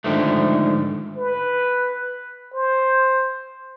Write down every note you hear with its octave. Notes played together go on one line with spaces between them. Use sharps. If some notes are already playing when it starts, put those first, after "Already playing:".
G#2 D3 D#3 F3 A3
B4
C5